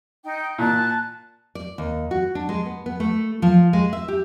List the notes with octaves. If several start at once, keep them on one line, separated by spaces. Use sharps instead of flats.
D#4 G5
A#2 A5 F#6
D5
D#2
F#4
D4
G#3
B3
B3
A3
F3
G#3
E5
G4